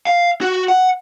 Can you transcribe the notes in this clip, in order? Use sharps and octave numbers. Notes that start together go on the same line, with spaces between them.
F5
F#4
F#5